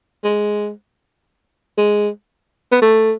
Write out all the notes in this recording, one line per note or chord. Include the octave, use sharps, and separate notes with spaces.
G#3
G#3
B3
A3